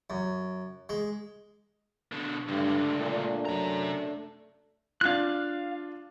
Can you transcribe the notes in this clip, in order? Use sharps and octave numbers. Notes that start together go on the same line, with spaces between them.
F#2
G#3
B2 D3
C#2 G2 D3 A3 D4
A#2
F#2 C3 A#5
D4 F4 F5 F#6